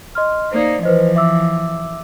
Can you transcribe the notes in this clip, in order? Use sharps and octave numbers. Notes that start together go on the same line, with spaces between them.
D#5 C6 F6
A#3 D#4 C5 D5
E3 F3 B4 C5 D#5
E5 D6 E6